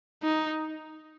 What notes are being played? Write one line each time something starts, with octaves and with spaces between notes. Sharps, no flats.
D#4